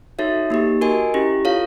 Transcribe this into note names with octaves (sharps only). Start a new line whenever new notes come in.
D#4 F#4 A4 C#5 E5
A#3 D#4 G4
F#4 A#4 D#5 G#5
C#4 E4 G4
F4 A4 C#5 F5